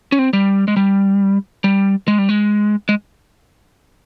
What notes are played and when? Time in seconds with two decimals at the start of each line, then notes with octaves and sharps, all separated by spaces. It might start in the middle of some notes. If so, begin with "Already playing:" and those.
0.12 C#4
0.19 C4
0.33 G3
0.68 G#3
0.77 G3
1.64 G3
2.08 G#3
2.18 G3
2.29 G#3
2.89 G#3